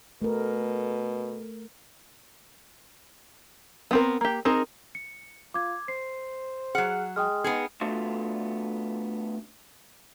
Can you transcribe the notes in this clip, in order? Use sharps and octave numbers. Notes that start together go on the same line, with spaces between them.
B2 A3 A#4
B3 C4 A#4
A#3 G4
C4 D#4 G#4 A#4
C#7
F4 D6 G#6
C5 C7
F#3 G#4 F#5 F6
G#3 G5 D#6 F6
B3 D#4 G#4
A3 B3 D4 F4 F#4 A4